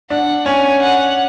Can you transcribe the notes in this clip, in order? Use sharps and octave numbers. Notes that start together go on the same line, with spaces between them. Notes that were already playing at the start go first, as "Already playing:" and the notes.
D4 F#5
C#4 G#5
F#5